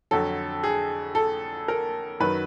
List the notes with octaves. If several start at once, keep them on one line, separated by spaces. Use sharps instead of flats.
F2 D3 F#3 A4
G#4
A4
A#4
F#2 D#3 F#3 B4